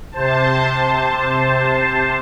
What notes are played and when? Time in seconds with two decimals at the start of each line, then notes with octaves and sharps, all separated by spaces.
0.12 C3 C5 A5